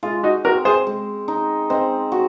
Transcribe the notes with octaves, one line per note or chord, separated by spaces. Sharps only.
G#3 F4
D#4 F#4
C4 F#4 A#4
G#4 C5
G#3
D#4
C4 C5 D#5
F#4